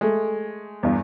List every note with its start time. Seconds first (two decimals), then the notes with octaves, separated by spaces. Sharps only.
0.01 G#3 A3
0.83 E2 G2